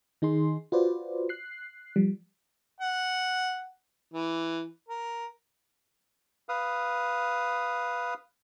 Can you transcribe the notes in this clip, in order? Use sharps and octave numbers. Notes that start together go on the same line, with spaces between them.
D#3 D#4 G#4 C6
F4 F#4 B4 C5 D5
F#6 C7
F3 G3
F#5
E3
A#4
B4 F5 D#6